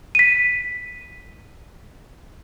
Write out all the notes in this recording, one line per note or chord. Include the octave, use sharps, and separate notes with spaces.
B6 D#7